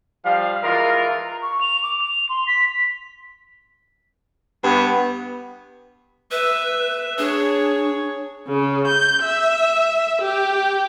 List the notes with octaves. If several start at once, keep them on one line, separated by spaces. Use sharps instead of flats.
F3 G3 F5
E3 G#3 F4 A#4
A#5
C#6
F7
D6
F7
C6
B6
G2 B3
B4 E5
D4 G#4 C#5
C#3
G6
E5
G4